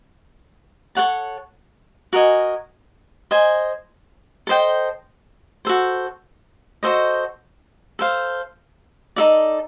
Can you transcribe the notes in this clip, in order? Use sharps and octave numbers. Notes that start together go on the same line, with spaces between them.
A4 C#5 F#5 A5
F#4 A#4 D#5 G#5
C5 D#5 G#5
A4 C5 D#5 G5
F#4 A4 C5
F#4 A4 C5 D#5
A4 C5 F5
D#4 F#4 A4 D5